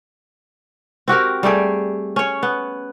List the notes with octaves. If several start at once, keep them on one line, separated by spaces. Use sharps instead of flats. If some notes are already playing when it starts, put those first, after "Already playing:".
C4 F#4 G4 A#4
G3 A3 G4 G#4
C#4 C#5
B3